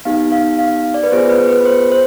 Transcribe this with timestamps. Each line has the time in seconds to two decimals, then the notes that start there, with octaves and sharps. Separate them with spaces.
0.05 B3 D#4 G4 F5
0.32 F5
0.59 F5
0.94 D5
1.03 B4
1.11 B3 F4 G#4 C5
1.29 B4
1.48 B4
1.65 C5
1.92 C5